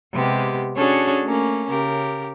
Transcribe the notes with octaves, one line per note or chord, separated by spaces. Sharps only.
C3 G#3 B3 G4
C#4 D4 F#4 G#4 A4 C#5
A3 A#3 C#4
C#3 G4 A#4